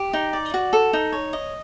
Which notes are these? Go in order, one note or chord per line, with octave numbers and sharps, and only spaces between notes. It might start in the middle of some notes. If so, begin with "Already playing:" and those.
Already playing: G4
D#4
D5
F#4
A4
D#4
C#5
D#5